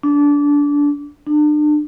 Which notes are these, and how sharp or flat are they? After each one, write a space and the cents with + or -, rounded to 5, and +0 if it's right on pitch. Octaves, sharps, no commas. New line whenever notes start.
D4 -20
D4 +35